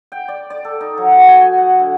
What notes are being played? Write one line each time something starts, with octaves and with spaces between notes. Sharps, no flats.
G5
D5
D5
A4
D#4
F#3
F#5
G#5
F#4
F#5
D3